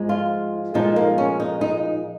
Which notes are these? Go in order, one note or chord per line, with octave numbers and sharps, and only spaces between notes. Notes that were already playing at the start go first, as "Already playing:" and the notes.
Already playing: G#2 F3 G#3
F4
A#2 F3 G#3 D#4
A#3
C#4
D#4
D#4